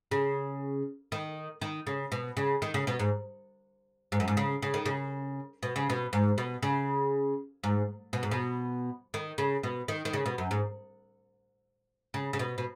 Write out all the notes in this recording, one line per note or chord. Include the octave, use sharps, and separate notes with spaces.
C#3
D#3
D#3
C#3
B2
C#3
D#3
C#3
B2
G#2
G#2
F#2
G#2
C#3
C#3
D#3
C#3
B2
C#3
B2
G#2
B2
C#3
G#2
B2
G#2
B2
D#3
C#3
B2
D#3
D#3
C#3
B2
F#2
G#2
C#3
C#3
B2
B2